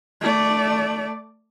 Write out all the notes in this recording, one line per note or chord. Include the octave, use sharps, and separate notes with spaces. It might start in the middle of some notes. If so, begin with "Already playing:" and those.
A3 D5